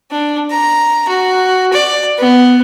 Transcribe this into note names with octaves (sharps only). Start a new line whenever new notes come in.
D4
A#5
F#4
D5
B3